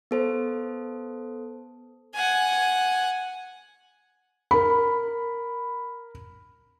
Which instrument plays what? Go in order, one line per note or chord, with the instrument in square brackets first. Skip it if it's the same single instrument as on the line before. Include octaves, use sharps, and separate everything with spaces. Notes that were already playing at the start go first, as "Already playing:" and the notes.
[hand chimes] B3 A4 C5
[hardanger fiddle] F#5 G#5
[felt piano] A#4 B5